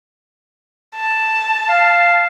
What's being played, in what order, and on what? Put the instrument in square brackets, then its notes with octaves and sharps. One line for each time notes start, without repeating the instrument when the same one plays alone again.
[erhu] A5
[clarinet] F5